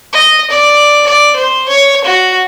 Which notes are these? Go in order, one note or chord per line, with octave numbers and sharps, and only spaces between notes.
D#5
D5
D5
C5
C#5
F#4